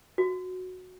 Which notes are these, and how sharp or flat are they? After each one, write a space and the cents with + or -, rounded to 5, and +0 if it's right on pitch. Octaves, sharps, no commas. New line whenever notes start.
F#4 -10